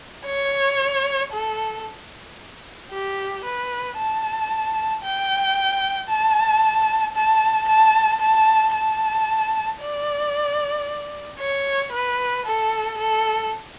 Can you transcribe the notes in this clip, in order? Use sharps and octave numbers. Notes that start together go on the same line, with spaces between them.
C#5
A4
G4
B4
A5
G5
A5
A5
A5
A5
A5
D5
C#5
B4
A4
A4